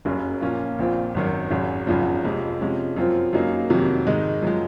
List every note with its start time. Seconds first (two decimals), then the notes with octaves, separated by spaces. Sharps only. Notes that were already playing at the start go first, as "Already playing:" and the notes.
0.05 F#1 F#2 C#3 F#3 C#4
0.41 A#2 F3 A#3 C#4 F4
0.79 A#1 A#2 F3 C4 F4
1.14 G#1 F#2 D#3
1.50 G#1 F#2 C#3
1.87 G#1 F#2 C#3 F3
2.24 F2 C3 F3 G#3
2.61 C3 F3 G#3 C#4
2.96 F#2 F3 C4 F4
3.33 F#2 C#3 F#3 A#3 D#4
3.70 F2 C3 D#3 F#3
4.06 G#2 D#3 G#3 D#4
4.42 F#2 F3 G#3